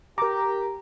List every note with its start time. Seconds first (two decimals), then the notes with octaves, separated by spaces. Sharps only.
0.18 G4 A#4 A#5 D6